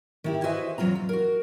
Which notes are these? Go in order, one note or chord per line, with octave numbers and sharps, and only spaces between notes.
D#3 E4 G4
F#4 B4 C5 D#5 E5 G#5
E2 F#3 C4 F4 A#5
F4
F#4 A#4